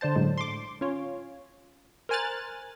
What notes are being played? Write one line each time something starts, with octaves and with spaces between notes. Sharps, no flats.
D3 D4 C5 A5
A2 D3 F#3 G#3
C6 D6
C#4 F4 C#5
A#4 C5 G#5 F6 F#6 A6